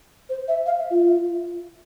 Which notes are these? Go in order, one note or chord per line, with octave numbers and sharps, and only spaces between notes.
C5
E5
F5
E5
F4